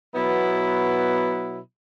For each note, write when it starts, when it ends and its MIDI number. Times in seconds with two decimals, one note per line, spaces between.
0.15 1.59 47
0.15 1.59 54
0.15 1.59 59
0.15 1.59 64